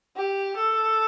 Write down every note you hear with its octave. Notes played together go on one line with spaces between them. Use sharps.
G4
A4